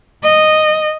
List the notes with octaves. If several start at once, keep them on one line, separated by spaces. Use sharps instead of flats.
D#5